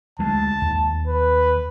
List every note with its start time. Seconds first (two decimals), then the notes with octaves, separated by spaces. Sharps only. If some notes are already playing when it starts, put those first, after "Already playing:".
0.19 D2 G#3 A5
0.62 D#2
1.07 B4